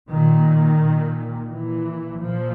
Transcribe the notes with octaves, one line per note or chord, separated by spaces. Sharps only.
A#2 D#3
A#2
A#2 E3
A#2 F3